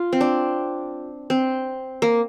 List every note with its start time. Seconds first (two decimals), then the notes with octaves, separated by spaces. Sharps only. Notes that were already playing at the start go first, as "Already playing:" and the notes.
Already playing: F4
0.13 C4
0.21 D4
1.30 C4
2.02 A#3